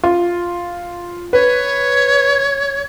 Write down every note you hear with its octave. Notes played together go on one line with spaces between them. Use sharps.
F4
B4 C#5